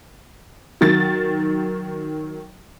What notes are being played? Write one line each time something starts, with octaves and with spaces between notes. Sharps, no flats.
D#3 F#3 A6